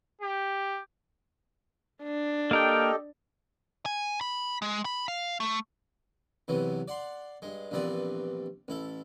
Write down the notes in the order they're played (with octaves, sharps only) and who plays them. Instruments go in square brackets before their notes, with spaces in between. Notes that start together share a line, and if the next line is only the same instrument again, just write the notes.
[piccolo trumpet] G4
[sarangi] D4
[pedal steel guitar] A#3 A#4 G5 [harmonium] G4 A4 D#5
[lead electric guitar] G#5
B5
G#3
B5
F5
A3
[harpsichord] E2 C3 E3 F#3 B3
D5 F#5 C6
G2 G#3
A#1 G2 E3 B3 C4 D5
A1 E4 A4